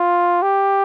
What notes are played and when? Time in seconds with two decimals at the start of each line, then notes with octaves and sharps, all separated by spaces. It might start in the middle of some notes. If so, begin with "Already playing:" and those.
Already playing: F4
0.42 G4